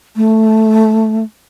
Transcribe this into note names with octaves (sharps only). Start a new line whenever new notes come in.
A3